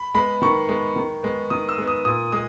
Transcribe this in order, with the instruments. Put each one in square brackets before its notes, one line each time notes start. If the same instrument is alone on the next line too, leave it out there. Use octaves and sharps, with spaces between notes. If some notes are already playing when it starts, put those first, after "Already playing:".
Already playing: [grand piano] B5
G#3 B3 B5
D#3 C#6
G#3 B3
D#3
G#3 B3
D#3 D#6
E6
G#3 B3
D#6
A#2 D#6
G#3 D#6